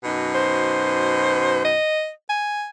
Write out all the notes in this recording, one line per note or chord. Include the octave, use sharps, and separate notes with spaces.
F#2 B2 D#4
C5
D#5
G#5